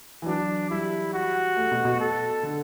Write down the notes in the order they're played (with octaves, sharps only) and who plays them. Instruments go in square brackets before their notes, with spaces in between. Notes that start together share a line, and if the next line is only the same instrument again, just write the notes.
[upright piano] E3
[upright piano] F#3 [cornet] D4
[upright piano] G3 [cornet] E4
[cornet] F#4
[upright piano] A3
B2
B2
[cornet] A4
[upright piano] D3